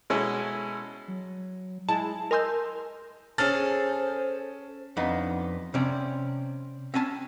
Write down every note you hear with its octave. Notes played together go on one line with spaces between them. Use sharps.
B2 G#3 C#4 E4 A4
F#3
G#3 E4 A5
A#4 D#5 G#5 C6 E6 G6
C#4 G#4 A4 C5 F6 A6
F2 B3 D4 D#4
C3 C4 C#4 D5
C4 C#4 G#5 A5